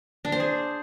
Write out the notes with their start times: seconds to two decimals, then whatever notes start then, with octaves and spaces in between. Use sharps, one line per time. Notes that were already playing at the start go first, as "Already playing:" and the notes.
0.25 D4
0.32 C5
0.40 G#4